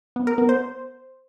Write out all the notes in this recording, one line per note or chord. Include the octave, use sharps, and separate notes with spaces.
B3
A#4
B3
C5